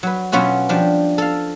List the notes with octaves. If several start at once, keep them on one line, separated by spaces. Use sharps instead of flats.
F#3 B4
B2 F#3 B3 C#4 F4 F#4
F3 G3 D4 G4
A4 F5